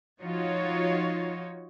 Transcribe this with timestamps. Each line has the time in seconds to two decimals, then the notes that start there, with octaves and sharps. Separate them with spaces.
0.22 F3 D#4 F4 F#4 C#5